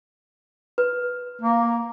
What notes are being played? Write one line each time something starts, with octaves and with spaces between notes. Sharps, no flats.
B4
A#3